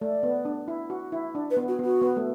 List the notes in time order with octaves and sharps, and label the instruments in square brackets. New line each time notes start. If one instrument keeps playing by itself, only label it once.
[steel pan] A3 [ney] D5
[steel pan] B3
D4
E4
F#4
E4
D4
[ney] B4
[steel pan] B3
[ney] F#4
[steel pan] B3
[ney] F#4
[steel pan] B3
A3